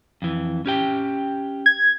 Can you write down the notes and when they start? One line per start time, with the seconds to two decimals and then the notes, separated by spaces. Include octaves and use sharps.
0.22 F2 E3
0.66 C#4 G4 G5
1.66 G#6